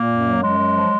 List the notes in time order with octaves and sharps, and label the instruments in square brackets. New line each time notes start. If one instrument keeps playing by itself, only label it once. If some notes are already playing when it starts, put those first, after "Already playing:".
Already playing: [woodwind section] A#2 A#3
F#2
F#3
F#2 G#3
F#3
F3